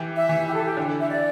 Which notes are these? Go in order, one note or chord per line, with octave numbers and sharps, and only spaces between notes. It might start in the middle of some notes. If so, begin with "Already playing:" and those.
Already playing: E3 G4
E5
E3
G4
A4
G4
D3
E5
D5